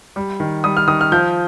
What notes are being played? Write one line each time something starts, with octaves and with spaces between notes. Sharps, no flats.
G3
D#3
G3 D#6
F6
D#3 D#6
F6
F3 G6